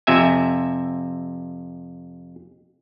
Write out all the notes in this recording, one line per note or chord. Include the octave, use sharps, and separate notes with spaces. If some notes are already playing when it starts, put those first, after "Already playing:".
F2 C3 E5 G#5